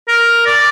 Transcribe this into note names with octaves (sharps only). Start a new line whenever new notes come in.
A#4
D5